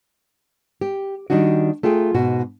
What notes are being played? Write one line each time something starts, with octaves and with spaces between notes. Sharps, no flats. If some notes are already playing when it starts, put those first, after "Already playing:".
G4
D#3 G3 D4 D#4 F#4
A3 F4 G#4 G5
G#2 B2 F#4